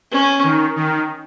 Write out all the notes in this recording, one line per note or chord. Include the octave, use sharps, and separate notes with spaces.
C#4
D#3
D#3